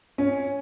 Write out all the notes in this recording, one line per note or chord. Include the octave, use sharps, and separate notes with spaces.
C#4